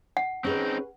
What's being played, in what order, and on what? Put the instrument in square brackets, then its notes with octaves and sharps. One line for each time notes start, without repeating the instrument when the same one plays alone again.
[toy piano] F#5
[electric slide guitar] C4 D#4 [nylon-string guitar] C#4 G#4 B4